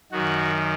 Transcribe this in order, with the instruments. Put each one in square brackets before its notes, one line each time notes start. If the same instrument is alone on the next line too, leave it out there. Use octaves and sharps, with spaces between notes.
[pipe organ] F#2 D#3 F#4